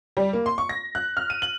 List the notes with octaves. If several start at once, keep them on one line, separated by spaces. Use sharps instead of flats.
G3
A#3
C6
C#6
A#6
F#6
F6
D#7
F#7